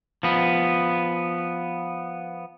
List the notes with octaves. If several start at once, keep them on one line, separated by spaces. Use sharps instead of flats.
F3 B3